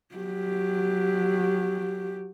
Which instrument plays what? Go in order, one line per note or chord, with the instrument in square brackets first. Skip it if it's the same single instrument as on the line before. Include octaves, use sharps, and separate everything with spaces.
[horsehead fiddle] F#3 G4